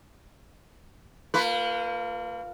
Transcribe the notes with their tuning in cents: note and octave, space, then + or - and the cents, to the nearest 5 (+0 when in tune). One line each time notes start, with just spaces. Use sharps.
A#3 -40 F4 +0 B4 +0